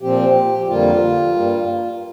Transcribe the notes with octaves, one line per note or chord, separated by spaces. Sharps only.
A#2 F3 C4 G4
G4
F2 D3 G3 A#3 F4
G2 G3 A#3